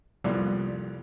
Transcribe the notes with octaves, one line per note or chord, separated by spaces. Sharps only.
C2 F2 A#2 G3 B3